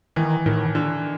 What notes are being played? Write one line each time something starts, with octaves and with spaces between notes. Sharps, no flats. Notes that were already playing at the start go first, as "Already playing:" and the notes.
D#3 E3
A2 D#3
D3